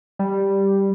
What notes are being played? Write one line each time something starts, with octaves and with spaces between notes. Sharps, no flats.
G3